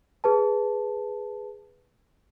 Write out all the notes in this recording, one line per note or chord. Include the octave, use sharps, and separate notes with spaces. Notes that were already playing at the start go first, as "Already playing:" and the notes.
G#4 B4 A5